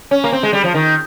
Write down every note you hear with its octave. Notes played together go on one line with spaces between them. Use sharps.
C#4
A#3
C4
G#3
G3
F3
D#3